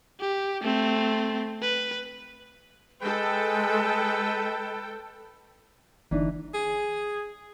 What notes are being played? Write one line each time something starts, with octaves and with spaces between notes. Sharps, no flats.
G4
A3 C4
B4
G#3 A4 B4 G5
G1 E3 D4 D#4
G#4